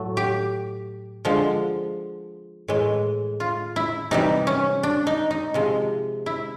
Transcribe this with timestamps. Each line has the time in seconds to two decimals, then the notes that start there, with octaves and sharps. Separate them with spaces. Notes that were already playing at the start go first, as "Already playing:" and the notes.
Already playing: A2 F#3 A3
0.17 G4
1.25 D3 F3 G#3
2.68 A2 E3 G#3
3.40 F4
3.76 E4
4.11 C3 E3 G3 D#4
4.47 C#4
4.83 D4
5.07 D#4
5.31 D#4
5.54 C3 F3 G#3
6.26 E4